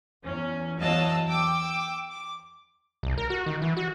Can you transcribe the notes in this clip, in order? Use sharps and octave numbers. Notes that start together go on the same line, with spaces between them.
E2 C#4
E2 F#3 D#5 F5 A5 E6
G5 D6 E6
D6
C2
A#4
F#4
D#3
E3
F#4